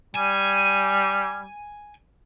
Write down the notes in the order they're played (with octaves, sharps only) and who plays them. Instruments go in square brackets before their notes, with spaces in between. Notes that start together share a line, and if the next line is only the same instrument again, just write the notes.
[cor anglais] G3 [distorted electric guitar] G#5